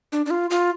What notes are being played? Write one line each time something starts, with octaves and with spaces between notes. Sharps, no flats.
D4
D4
F4
F4